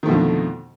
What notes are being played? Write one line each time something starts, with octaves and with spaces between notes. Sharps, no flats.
F2 B2 D3 D#3 A3